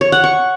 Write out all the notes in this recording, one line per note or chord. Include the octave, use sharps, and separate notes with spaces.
C#5
F#5
C#6